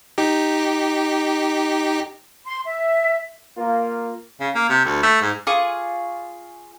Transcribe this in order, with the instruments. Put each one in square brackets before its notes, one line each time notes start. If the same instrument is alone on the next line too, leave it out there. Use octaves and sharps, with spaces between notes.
[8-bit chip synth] D#4 G4
[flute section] C6
E5
[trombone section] A#3 F4
[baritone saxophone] C#3
A#3
C3
D2
A3
G#2
[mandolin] F4 G#4 C#6 D6